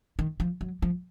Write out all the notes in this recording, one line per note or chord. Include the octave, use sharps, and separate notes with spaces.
D#3
F3
F#3
F3